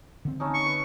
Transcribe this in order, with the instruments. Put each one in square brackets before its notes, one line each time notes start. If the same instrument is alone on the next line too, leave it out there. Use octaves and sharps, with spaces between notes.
[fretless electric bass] D3 C4
[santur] A3 C#4 D#4
[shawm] C#6
[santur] B4